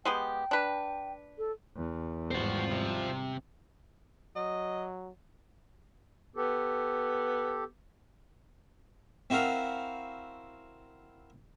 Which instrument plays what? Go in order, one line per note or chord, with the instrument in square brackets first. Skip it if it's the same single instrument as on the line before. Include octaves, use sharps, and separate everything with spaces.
[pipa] G#3 B3 G4 [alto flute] G5
[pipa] D4 B4
[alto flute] A4
[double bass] E2
[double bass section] G#1 G3 [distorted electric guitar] C4 F#4 [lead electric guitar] F4 C5
[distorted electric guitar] C3
[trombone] F#3 [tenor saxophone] D#5
[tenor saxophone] B3 [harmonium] G4 A4
[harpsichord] C4 E4 F#4 A#4 F5